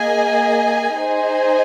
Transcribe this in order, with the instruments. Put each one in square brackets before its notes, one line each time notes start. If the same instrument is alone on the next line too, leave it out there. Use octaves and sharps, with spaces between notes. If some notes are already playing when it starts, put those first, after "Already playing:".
Already playing: [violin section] A#3 G#4 D#5 G#5
D#4 G#4 C5 D#5 G#5